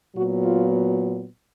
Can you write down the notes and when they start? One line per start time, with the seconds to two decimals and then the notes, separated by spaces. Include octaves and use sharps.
0.15 A#2 F#3 B3 F#4
0.43 F4